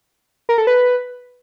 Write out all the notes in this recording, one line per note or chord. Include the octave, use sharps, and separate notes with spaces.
A#4
A4
B4